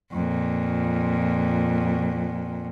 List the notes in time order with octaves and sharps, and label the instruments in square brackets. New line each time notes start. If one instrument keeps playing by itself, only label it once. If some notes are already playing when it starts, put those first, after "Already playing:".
[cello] F2 A#2